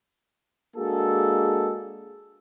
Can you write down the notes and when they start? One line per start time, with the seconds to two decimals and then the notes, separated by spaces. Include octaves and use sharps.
0.76 G#3 A#3 D4 F#4 G#4 A4